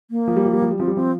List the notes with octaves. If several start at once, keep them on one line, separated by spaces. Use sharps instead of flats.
A#3
F3
G3
F3
G3
F3
G3
F3 C4
G3
F3 C4